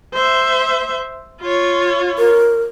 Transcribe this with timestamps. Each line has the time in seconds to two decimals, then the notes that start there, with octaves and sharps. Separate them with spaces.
0.14 C5 E5
1.42 F4 C#5
2.18 A#4